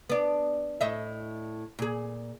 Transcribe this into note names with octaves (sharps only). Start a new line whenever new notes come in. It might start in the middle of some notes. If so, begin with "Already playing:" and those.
B3 D4
A2 D#5 E5
A#2 G#4